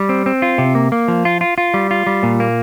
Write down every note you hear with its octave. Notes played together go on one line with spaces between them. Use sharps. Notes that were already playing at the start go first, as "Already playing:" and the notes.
Already playing: G3
C4
C4
F4
C3
A#3
A#3
F3
F4
F4
F4
G3
F4
G3
A#2
A#3